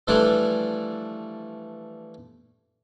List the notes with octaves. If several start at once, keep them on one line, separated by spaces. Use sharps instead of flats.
E3 F3 G3 A3 D4 E4